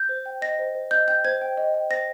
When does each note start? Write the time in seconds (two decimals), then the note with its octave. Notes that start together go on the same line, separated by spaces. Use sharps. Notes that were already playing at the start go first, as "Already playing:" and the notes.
Already playing: G6
0.09 C5
0.26 G5
0.42 D#5 A#6
0.59 C5
0.75 C5
0.91 D#5 G6
1.08 G5 G6
1.25 C5 G#6
1.41 G5
1.57 D#5
1.74 G5
1.90 C5 A#6